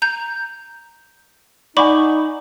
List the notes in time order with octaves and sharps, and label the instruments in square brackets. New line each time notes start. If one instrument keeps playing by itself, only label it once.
[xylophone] A#5 G6
[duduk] D#4 [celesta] D5 F#5 G#5 [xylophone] B5 C#6 D6